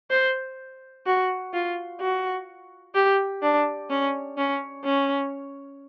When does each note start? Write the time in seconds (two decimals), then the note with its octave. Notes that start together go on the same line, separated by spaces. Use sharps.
0.11 C5
1.06 F#4
1.53 F4
2.01 F#4
2.94 G4
3.42 D4
3.90 C#4
4.37 C#4
4.84 C#4